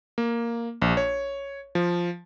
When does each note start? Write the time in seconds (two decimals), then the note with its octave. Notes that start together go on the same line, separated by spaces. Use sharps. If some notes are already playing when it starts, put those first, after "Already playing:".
0.18 A#3
0.82 A#1
0.97 C#5
1.75 F3